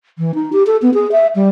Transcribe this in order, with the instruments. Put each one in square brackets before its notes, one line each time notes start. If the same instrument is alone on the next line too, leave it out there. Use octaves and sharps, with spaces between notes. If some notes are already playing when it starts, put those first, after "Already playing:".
[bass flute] E3
D#4
G4
A4
B3
G#4
E5
G3